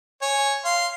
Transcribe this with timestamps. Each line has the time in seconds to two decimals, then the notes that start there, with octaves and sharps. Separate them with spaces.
0.22 C#5 G#5
0.65 F5 C6